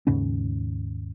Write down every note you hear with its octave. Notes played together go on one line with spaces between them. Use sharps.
D#2 G#2 C#3 C#4